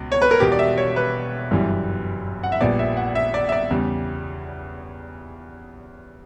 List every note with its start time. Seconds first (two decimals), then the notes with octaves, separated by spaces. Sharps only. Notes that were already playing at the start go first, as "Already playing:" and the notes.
Already playing: C#2 B2
0.12 C#5
0.22 B4
0.31 A#4
0.40 E1 E2 B2 G4
0.52 D5
0.59 E5
0.77 C#5
0.96 B4
1.50 G1 F#2 E3 G3
2.43 F#5
2.52 E5
2.61 A#1 A#2 G3 B3 D5
2.79 E5
2.97 F#5
3.15 E5
3.34 D5
3.49 E5
3.52 D5
3.70 E2 C#3 G3